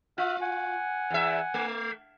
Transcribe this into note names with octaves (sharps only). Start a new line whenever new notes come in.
F4 E5 F6 F#6
F#5 G#5
E2 E5
A3